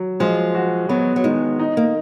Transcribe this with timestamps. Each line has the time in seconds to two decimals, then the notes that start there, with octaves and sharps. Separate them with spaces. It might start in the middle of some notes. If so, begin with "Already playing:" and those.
Already playing: F#3
0.20 F3 G#3
0.54 F#4
0.89 F#3 B3
1.16 F#3
1.24 D#3 G#3
1.59 D#4
1.77 A#3